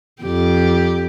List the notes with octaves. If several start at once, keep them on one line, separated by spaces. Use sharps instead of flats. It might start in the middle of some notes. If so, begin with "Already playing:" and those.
F2 G4